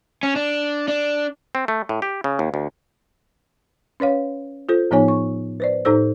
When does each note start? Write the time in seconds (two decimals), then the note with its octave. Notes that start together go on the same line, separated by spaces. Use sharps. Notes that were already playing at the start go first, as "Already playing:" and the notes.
0.23 C#4
0.36 D4
0.88 D4
1.55 C4
1.68 A3
1.89 A2
2.02 G4
2.24 C#3
2.39 D#2
2.54 D2
4.00 C#4 B4 C#5 F5
4.69 F4 A4 C5
4.91 A2 F3 B3 D#4 C#5 G#5
5.08 C#6
5.60 B4 C5 D5
5.85 A2 D#4 A4 C5 E6